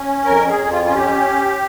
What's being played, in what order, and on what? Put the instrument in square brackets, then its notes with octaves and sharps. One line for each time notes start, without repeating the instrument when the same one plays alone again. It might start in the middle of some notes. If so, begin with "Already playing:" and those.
Already playing: [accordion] C#4
F2 A#4
G#4
F2
F4
C#4 F4
G4